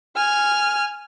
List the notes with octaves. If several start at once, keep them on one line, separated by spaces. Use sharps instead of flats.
G#5 F6